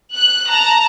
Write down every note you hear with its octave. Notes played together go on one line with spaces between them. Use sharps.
F#6
A5 A#5